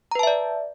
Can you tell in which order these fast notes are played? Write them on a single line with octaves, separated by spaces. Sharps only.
A#5 B4 A5 E5 D5